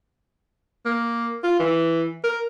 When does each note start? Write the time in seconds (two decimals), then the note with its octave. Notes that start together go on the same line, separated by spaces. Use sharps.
0.86 A#3
1.44 F4
1.59 E3
2.24 A#4